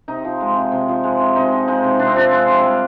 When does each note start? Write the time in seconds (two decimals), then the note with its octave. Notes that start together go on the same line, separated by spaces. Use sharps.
0.08 C3 D#4
0.24 F3
0.40 G#3
0.56 C3
0.72 C3
0.89 F3
1.03 G#3
1.20 C3
1.36 C3 D#4
1.52 F3
1.68 G#3 D#4
1.84 C3
1.99 C3 D4
2.07 C4
2.16 F3 D4
2.31 G#3
2.47 C3
2.63 G3